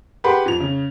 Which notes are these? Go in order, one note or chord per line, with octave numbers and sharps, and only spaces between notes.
G4 G#4 B4 F#5 B5 C6
F2 F7
C#3